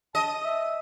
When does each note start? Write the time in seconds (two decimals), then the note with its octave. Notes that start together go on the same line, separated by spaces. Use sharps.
0.15 D#5 A5
0.44 E5